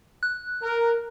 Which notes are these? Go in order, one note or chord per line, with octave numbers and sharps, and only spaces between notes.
F#6
A#4